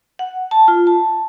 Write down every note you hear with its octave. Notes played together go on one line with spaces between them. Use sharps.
F#5
A5
F4
A5